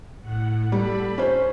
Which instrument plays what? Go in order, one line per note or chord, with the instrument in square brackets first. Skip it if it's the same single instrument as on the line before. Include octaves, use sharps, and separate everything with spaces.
[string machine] A2 F#5
[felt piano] G3 [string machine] A4 B5
[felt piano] C#4 C5